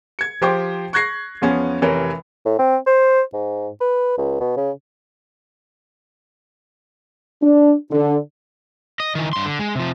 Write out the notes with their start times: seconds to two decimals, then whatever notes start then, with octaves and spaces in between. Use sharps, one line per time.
0.19 G#6 C#7
0.42 F3 G4 C5 G5 D6
0.93 C#6 F#6 G#6 A#6 C7
1.42 E2 F3 B3 C#4 G#5
1.81 F1 C3 E3 A#4 C#5
2.46 A2
2.59 C4
2.86 C5
3.33 G#2
3.81 B4
4.18 C#2
4.40 B2
4.57 C#3
7.42 D4
7.91 D3
9.00 D#5
9.15 D#3 E3
9.33 G2 C6
9.46 D3
9.59 G#3
9.75 C3 F3